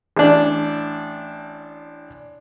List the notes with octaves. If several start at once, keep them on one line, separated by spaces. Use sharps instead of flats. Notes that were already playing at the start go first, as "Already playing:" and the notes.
A1 D4